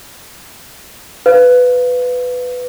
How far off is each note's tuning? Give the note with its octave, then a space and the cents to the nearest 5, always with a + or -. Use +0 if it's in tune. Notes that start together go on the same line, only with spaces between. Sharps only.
B4 +10 F5 +0